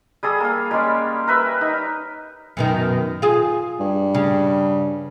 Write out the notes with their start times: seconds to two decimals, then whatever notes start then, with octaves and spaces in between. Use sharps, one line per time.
0.23 G3 G#4 A4 D#6
0.40 A#3 F5
0.71 G3 G#3 C#4 D5
1.27 A#4 B4 E5
1.61 D#4
2.57 F#2 B2 D#3
3.22 F4 G#4
3.80 G2
4.14 C#3